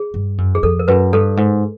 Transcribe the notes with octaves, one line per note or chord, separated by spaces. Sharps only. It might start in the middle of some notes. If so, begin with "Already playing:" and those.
Already playing: G#4
G2
F#2
G#4
F2 A4
A#4
F#2 B4
G2 A4
G#2